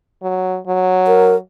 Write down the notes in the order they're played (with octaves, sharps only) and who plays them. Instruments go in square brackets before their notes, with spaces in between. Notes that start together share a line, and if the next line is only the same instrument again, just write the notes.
[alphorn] F#3
F#3
[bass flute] A#4